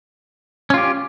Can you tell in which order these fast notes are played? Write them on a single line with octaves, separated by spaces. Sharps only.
C#4 F4 G4